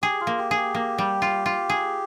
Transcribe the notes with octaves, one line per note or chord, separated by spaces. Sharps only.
G4 G#4
F4
A#3
G4
G#4
G4
A#3
G3
F4
F4
G#4